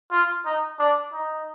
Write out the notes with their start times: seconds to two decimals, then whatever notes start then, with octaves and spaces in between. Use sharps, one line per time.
0.11 F4
0.45 D#4
0.79 D4
1.13 D#4